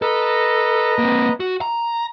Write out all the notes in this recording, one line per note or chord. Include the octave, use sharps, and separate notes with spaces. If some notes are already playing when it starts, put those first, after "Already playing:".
A4 B4 D#5 A#5
A#3 C4
F#4
A#5